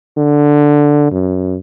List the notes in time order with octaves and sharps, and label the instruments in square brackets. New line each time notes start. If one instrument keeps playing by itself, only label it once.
[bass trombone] D3
F#2